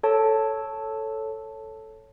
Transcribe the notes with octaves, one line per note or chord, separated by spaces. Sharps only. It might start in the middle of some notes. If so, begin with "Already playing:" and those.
A4 C#5 A5